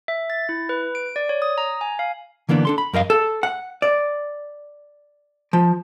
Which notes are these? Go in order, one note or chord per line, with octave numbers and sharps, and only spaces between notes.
E5
A6
E4
B4
D7
D5
C#5
D#6
A#5
G#5
F5
D3 E3 A#3 B3 D4
D4 A4 C6
B5
F#2 A#4 D#5 F5
A4
F#5
D5
F3